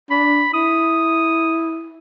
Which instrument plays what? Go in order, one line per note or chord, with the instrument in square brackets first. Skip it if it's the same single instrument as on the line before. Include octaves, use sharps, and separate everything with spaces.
[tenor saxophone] D4 [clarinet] B5
[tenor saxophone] E4 [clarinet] D#6